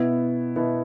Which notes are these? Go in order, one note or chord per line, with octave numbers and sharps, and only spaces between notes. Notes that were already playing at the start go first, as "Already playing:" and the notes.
Already playing: B2 B3 E4
B2 B3 E4